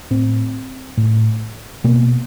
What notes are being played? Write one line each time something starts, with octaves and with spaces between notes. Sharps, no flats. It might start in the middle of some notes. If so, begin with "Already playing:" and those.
A2 C4
A2
B2 A#3